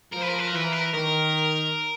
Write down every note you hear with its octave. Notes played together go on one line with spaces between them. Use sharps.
F3 A#4
B4
A#4
B4
A#4
E3 B4
A#4
B4
A#4
D#3 A#4